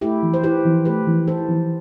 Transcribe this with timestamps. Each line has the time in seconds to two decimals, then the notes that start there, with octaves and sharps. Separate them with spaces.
0.01 A3 E4 G4
0.22 E3
0.34 C5
0.44 E4 G4 B4
0.65 E3
0.85 A3 G4 B4
1.07 E3
1.27 E4 A4 C5
1.48 E3